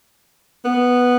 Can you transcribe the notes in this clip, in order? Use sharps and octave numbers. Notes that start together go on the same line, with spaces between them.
B3